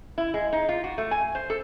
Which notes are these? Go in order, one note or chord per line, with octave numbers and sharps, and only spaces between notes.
E4
G#3
D#4
F4
F#4
A3
G#5
C5
A4